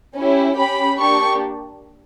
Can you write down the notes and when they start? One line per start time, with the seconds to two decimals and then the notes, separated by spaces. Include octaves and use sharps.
0.16 C#4 E4 G4
0.57 C#4 G4 B5
0.98 A#3 D4 G4 C#6